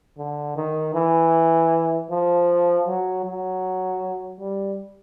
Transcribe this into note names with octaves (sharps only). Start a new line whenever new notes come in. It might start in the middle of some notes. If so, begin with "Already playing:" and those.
D3
D#3
E3
F3
F#3
F#3
G3